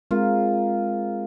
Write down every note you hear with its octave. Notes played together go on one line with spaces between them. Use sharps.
G#3 C4 F4 A#4